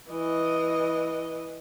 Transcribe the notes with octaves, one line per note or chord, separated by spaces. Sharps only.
E3 D#5